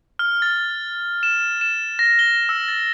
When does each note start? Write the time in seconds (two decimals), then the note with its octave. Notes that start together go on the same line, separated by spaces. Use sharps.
0.19 F6
0.42 A6
1.23 E7
1.61 E7
1.99 A#6
2.19 G7
2.49 E6
2.68 A6